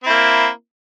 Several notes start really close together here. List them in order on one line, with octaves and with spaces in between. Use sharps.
C4 E4 A#3